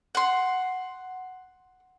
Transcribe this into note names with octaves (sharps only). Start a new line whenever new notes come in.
F#5 C6